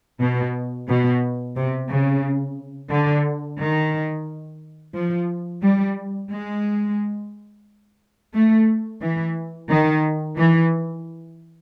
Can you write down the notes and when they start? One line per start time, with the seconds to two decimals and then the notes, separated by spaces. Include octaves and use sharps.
0.20 B2
0.88 B2
1.56 C3
1.90 C#3
2.91 D3
3.59 D#3
4.94 F3
5.62 G3
6.31 G#3
8.34 A3
9.02 E3
9.69 D#3
10.38 E3